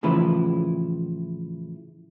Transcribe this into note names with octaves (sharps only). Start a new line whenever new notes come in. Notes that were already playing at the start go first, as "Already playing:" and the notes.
A2 C#3 E3 F3 E4 B4